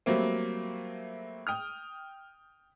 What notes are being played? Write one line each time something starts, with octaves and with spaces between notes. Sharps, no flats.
F#3 G3 A3 A#3 C4
G5 D#6 F6